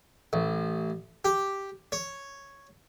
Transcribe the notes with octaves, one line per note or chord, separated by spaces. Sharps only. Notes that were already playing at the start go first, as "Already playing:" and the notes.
A1
G4
C#5